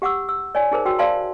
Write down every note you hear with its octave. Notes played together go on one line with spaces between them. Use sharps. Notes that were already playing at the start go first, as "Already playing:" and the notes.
G4 F#5 D6 E6
E6
C#5 D5 G#5
D#4 G#4 A#4 C5
F#4 G5 E6
C5 D5 F5 A5 B5 C6